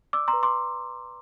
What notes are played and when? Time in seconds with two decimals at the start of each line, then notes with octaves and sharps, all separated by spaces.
0.13 D5 D6 E6
0.28 A#5 C6
0.33 B4
0.43 C6 D6